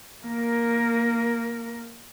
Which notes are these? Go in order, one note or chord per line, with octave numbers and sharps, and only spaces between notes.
A#3 A#4